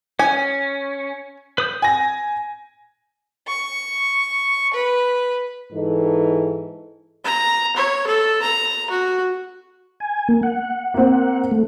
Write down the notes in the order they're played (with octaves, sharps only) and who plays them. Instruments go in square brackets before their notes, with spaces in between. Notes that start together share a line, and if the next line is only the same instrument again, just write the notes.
[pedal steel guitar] C#4 [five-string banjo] G#5
[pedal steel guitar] B4 D#6 G6
[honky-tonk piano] G#5 A#6
[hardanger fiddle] C#6
B4
[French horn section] G#2 E3 D#4 A4
[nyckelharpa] A#5
C#5
A4
A#5
F#4
[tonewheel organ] G#5
A#3
F#5
[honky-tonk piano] A#3 C4
[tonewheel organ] A3